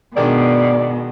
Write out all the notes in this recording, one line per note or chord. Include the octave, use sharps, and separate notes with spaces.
B2 D#3 G#3 D4 D5